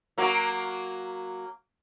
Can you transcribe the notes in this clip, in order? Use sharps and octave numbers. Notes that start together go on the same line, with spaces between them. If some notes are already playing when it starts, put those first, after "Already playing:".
F#3 A#3 F#4